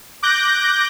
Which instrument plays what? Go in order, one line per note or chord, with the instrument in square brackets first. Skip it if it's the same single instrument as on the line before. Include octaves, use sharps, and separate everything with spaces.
[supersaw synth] D6 F#6 G6 A#6